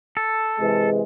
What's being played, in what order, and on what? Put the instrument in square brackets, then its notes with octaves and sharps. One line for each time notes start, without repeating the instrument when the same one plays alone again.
[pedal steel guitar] A4
[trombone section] C3 E3 G#3